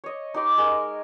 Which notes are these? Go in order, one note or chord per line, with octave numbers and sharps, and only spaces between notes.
C#5 D#5
D#4 G4 C6 D6
G#3 A#4